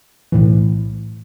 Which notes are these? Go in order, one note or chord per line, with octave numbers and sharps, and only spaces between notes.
B1 A2 E3